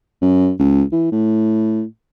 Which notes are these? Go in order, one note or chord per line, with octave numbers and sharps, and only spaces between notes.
F#2
C#2
E3
A2